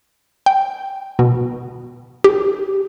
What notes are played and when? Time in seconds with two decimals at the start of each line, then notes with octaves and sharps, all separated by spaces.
0.46 G5
1.19 B2
2.24 G4